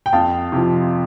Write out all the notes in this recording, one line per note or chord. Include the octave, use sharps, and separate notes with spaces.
G5
F2 F5 A5
C3 F3